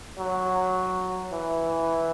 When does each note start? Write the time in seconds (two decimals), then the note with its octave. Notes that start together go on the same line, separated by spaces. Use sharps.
0.18 F#3
1.33 E3